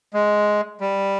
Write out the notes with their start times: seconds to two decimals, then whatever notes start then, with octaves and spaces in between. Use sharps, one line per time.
0.14 G#3
0.81 G3